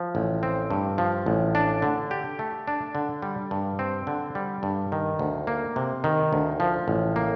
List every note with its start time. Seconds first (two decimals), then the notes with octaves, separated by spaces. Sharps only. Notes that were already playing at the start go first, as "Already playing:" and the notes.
Already playing: F3
0.15 A1
0.43 C4
0.70 G2
0.98 F3
1.26 A1
1.55 D4
1.82 D3
2.11 G4
2.39 A3
2.68 D4
2.95 D3
3.22 G3
3.51 G2
3.79 C4
4.07 D3
4.35 G3
4.63 G2
4.92 D#3
5.19 D2
5.47 A#3
5.76 C3
6.04 D#3
6.33 D2
6.60 F3
6.88 A1
7.16 A#3